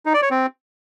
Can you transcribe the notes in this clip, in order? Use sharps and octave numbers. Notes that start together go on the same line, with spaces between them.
D#4
D5
C#5
C4